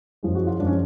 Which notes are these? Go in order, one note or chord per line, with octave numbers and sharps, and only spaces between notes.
F#2 F3 G#3 G#4
F#4
F4
F#2 F3 G#3 D4
C#4